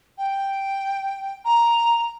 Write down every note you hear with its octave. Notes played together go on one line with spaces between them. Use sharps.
G5
A#5